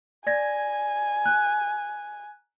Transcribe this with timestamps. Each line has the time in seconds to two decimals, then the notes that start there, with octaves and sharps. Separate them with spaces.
0.27 D5 G#5 G#6 A#6
1.24 A#5 F#6